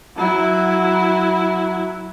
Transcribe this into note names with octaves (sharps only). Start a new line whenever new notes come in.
F#3 E4